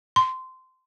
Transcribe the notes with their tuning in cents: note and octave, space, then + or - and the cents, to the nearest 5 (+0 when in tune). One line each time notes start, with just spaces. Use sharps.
C6 -15